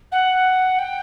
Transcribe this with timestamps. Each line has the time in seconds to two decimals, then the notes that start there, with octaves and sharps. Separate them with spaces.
0.11 F#5
0.78 G5